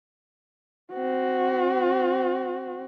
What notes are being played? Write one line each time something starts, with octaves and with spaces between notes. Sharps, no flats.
C4 F#4